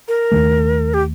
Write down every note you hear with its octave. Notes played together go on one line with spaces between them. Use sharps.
A#4
D#2 D#3 A3
G4